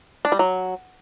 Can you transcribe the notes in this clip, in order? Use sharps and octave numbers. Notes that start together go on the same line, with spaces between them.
D4
G3
F#3